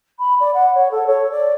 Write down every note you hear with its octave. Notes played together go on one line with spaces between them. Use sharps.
B5
D5
F#5
C#5
A4
C#5
D5